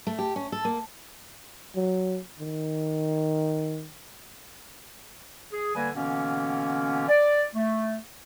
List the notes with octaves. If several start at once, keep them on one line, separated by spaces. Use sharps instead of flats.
A3
G4
C#4
A4
A#3
F#3
D#3
G#4
D3 G3 A#3 B4 G#5
B2 D3 E3 A#3 B3 C#4
D5
A3